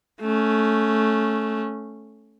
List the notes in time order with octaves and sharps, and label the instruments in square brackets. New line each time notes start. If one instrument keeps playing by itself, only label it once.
[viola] A3 C#4